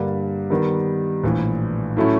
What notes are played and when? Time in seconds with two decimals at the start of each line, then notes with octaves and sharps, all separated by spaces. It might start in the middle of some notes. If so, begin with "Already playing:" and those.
Already playing: G2 D3 G3 A#3
0.50 D#3 G3 B3
1.24 A#1 A2 E3
1.96 A2 F#3 A3 C#4 E4